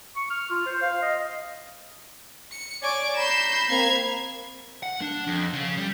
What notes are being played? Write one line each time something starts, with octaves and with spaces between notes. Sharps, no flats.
C#6
F6
F4
C5
F5
D#5
C#7
C#5 D5 G#5 C#6 D6
A#5 B5 G6 C7 E7
A#3 C4 G#6 F7
F#5
D4
F2
C#3
G3